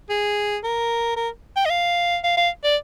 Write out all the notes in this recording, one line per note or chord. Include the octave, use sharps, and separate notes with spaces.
G#4
A#4
A#4
G5
D#5
F5
F5
F5
D5